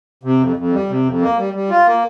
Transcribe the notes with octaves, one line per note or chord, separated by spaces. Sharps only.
C3
F2
F2
G3
C3
F2
A#3
G3
G3
F4
A#3